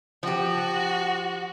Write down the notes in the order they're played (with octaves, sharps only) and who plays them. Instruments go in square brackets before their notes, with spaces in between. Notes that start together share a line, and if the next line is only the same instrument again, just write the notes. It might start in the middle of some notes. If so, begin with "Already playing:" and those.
[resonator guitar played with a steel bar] F3 G4 [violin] F#4